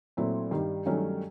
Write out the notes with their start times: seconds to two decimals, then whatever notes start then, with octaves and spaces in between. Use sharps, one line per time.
0.17 A#2 F#3 A3 C4 E4
0.51 G2 D#3 G3
0.86 G2 D#3 F#3 A3 C#4